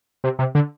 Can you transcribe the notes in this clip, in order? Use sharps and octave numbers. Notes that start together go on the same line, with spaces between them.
C3
C3
D3